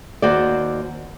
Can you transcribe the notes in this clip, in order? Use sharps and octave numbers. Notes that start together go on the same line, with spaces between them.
D#2 F#4 C5 D5